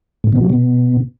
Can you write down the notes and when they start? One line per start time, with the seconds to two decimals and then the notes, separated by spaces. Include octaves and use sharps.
0.24 A2
0.33 B2
0.41 F#3
0.50 B2